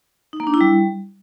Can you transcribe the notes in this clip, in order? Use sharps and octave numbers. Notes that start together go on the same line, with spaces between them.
D#4
A#3
D4
E4
G3